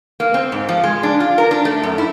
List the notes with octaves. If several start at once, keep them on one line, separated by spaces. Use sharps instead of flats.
A#3
C4
G#2
F3
G#3
D4
F4
A#4
D4
A3
F#2
E4